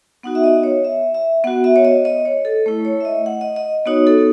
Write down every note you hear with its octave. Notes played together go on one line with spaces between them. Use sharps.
B3 D#4 F#4 F#5
E5
D#5
C#5
E5
E5
B3 F#4 F#5
E5
C#5
D#5
D#5
C#5
A4
A3 E4
C#5
E5
D#5
F#5
D#5
D#5
B3 D#4 F#4 C#5
A4